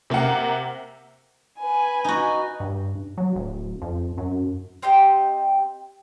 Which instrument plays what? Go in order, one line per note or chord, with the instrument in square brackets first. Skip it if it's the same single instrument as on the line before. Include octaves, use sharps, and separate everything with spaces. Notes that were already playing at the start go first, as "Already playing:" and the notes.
[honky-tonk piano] C3 A#3 A#4 F#5
[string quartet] B4 G#5
[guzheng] D#4 F#4
[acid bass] G2
F#3
D1
F2
F#2
[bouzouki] C4 G4 D#5 G5